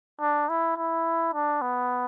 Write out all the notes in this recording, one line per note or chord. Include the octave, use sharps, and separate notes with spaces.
D4
E4
E4
D4
B3